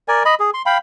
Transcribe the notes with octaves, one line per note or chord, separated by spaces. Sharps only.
A#4 D5 G#5
D#5 B5
G#4
C6
F5 G5 B5